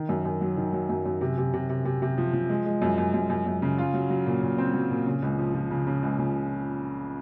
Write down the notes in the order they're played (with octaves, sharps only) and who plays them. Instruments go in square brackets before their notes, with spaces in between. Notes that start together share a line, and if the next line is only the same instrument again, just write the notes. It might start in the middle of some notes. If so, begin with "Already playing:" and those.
Already playing: [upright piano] D#3
F#2
F#2
F#3
D#3
F#3
F#2
F#2
C3
C3
C3
C3
C3
C3
F3
F3
G#3
G#3
F#2
F#2
F#2
F#2
F#2
C#3
F4
F#3
F#3
A#2
A#2
C4
F#3
A#2
C#3
C#2
F3
F3
C#3
C#3
C#2
C#3